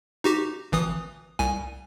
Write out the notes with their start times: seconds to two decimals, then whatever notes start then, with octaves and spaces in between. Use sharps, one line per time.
0.24 D#4 F#4 G4
0.72 G#1 E3 D#6
1.39 C2 G#5